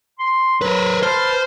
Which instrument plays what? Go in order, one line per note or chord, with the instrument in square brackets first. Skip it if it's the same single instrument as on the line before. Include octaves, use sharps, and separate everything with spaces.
[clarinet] C6
[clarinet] F#3 [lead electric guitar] A#4 B4
[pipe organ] B4 A5 [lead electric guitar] C5 [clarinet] F6